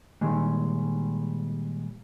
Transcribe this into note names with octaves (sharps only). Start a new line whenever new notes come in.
A#2 D#3 G3 G#3